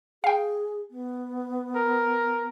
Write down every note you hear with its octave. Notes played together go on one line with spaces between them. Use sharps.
G#4 F5 G5
B3
A#4